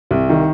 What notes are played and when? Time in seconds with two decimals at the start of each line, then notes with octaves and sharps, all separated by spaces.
0.11 C2
0.29 D#3